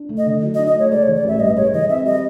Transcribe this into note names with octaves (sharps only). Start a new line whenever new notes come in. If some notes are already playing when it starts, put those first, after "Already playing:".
Already playing: D4
A3
D#5
D3
F#3
D#5
D4
D#5
A3 C#5
G#3 D5
C#5
E3
D5
A1 E5
G2 D#5
G#3 C#5
E3 D#5
C4 E5
G3 D#5